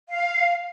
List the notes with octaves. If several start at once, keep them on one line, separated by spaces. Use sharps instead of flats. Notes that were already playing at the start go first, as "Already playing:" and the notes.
F5